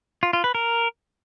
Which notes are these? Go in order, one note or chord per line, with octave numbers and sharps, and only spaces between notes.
F4
F4
B4
A#4